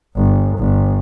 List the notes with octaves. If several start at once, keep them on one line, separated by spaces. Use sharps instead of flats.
G1
G1